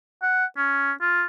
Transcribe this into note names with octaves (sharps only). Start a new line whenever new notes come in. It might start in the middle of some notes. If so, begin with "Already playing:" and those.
F#5
C#4
F4